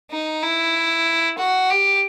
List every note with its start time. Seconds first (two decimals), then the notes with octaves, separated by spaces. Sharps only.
0.11 D#4
0.43 E4
1.38 F#4
1.70 G4